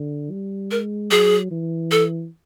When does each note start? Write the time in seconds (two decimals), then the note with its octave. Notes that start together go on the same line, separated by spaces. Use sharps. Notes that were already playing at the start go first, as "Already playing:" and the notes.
Already playing: D3
0.31 G3
0.71 G#3 A#4
1.11 F#3 G#4
1.51 E3
1.91 A4